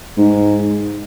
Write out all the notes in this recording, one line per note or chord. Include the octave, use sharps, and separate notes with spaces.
G#2